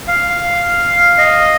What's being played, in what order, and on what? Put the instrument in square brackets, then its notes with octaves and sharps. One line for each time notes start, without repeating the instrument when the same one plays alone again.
[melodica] F5
D#5